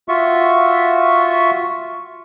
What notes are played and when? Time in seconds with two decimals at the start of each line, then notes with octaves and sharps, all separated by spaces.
0.08 F4 F#4 E5 C#6